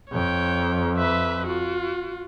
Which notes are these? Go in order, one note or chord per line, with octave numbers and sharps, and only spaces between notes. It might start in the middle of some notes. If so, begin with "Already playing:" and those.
F2 C#5 G5
B4 E5
F4 F#4